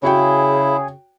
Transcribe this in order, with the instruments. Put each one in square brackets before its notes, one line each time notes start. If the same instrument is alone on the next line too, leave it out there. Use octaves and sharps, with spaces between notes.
[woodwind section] C#3 [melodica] E4 [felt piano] F#4 C#5 G5 [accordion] G#4